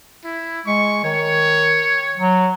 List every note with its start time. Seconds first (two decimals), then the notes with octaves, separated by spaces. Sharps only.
0.24 E4
0.66 G#3 C#6
1.04 D#3 C#5
2.17 F#3